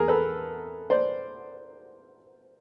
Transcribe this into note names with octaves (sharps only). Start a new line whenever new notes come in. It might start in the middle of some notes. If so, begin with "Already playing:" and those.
Already playing: E2 G#4 A#4
A4 B4
C5 D5